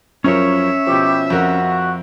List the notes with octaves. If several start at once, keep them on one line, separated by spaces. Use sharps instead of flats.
F#2 F3 C#4 A#4 C#5 E5
B2 F3 E4 G4
F2 F#4 A#4